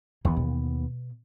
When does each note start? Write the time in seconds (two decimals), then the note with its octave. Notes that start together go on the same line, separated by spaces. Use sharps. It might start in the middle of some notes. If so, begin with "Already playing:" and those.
0.25 D#2 E3 B3
0.37 B2